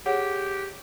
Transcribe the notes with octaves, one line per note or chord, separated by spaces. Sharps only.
G4 G#4 C#5 F#5